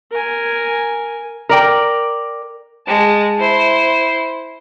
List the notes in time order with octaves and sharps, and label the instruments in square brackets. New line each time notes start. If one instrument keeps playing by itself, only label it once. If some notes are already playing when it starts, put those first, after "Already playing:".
[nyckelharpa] A#4 G#5
[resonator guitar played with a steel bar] A#4 D5 G5
[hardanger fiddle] G#3 A5
E4 C5